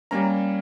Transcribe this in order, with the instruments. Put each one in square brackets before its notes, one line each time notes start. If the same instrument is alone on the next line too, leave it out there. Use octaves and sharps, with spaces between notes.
[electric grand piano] G3 A#3 C#4 A#5